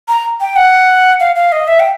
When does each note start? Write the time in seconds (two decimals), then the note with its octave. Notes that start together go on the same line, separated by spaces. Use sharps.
0.08 A#5
0.41 G5
0.56 F#5
1.20 F5
1.35 F5
1.52 D#5
1.68 E5
1.79 G5